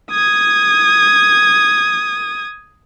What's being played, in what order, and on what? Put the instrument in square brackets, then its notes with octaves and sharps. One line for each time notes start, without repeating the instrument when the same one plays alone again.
[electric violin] D#6 G#6